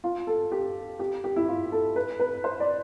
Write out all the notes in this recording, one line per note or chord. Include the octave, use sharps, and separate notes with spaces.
F4
A4
G4
G4
G4
E4
F4
A4
B4
B4
C5
D5